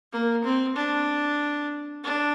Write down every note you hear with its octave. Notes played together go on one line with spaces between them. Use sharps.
A#3
C4
D4
D4